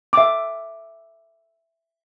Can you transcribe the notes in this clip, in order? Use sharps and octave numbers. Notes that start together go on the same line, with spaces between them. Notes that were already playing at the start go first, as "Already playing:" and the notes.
E5 D6